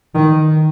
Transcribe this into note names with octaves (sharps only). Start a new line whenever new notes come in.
D#3